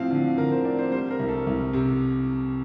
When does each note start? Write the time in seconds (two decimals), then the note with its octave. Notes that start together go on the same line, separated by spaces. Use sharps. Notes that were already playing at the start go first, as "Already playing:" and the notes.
Already playing: A2 F3 C4 F5
0.11 D3
0.38 D3 A#4
0.52 C5
0.65 C4 D5
0.79 C5
0.92 G3 C5
1.11 A#4
1.19 C2
1.29 A4
1.47 C2
1.73 C3